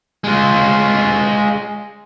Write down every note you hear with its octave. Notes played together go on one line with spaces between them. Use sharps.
G#3 F4